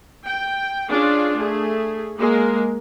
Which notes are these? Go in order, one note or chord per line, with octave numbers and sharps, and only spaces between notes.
G5
C#4 D4 F4 G#4
A3 G#4
G#3 A#3 A#4